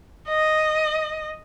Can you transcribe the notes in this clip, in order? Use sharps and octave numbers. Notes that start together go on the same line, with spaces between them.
D#5